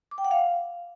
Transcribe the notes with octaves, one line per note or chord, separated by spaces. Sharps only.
D6
G5
F#5
F5